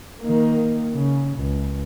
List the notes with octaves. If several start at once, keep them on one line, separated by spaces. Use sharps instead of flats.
D#3 A#3
C#3
C#2